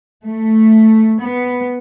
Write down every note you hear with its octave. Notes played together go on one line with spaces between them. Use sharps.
A3
B3